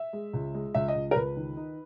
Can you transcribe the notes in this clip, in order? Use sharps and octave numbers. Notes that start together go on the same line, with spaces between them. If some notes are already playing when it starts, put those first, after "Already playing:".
Already playing: E5
G#3
C#2
G#3
C#2 E5
D#5
C#2
A#4
C#2 B4
D#3
D#4